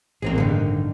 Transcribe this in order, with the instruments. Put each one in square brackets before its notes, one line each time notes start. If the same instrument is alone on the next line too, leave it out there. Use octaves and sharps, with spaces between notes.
[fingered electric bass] A1 [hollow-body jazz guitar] A#3 C4 G#4
[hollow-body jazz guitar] G2 D3 D#3